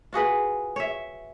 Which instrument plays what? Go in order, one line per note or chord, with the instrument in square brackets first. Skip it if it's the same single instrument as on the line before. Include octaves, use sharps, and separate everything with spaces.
[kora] F4 F#4 G#4 B4
C#5 E5